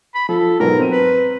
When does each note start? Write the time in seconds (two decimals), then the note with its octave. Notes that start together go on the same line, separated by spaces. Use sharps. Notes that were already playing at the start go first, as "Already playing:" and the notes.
0.15 B5
0.29 F3 A4
0.60 G#2 B2 F#3 A#4
0.79 C4 D#7
0.92 B4